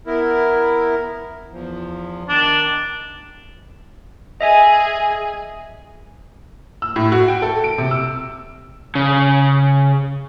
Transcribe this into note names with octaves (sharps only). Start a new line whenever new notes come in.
B3 E4 A#4
E2 F3
D#3 D4
G#4 D#5 E5 G#5
E6
A2
F#4
G5
A4
D7
C3
E6
C#3